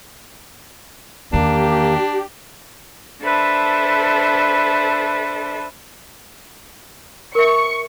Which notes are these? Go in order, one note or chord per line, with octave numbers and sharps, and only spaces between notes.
E2 D#3 A#3 D4 G4
D4 A4 B4 C5 E5
A#4 E5 C#6 C#7